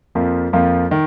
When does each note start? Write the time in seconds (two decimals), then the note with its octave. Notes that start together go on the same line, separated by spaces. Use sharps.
0.15 F2 F3 A#3 F4
0.53 F2 F3 A#3 F4
0.91 D#3